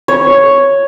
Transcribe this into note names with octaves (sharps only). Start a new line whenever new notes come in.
C#5